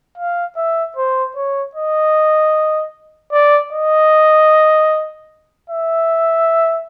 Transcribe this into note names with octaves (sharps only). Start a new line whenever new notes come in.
F5
E5
C5
C#5
D#5
D5
D#5
E5